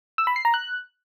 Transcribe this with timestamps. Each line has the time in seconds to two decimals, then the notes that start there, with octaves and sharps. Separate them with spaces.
0.18 E6
0.27 B5
0.36 C7
0.45 A#5
0.54 F#6